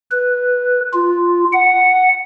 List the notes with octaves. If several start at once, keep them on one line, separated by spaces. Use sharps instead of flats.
B4
F4
F#5